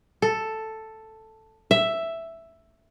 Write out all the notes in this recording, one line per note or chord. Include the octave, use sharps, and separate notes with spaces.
A4
E5